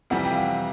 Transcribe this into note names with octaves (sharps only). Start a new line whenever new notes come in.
F2 C3 E3 G3 F#5
G5
F5
F#5